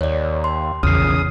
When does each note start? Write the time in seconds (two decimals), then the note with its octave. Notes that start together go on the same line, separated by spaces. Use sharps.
0.01 D#2 C#5 D5
0.44 C6
0.83 A#1 E2 C#3 D#6 F6 C7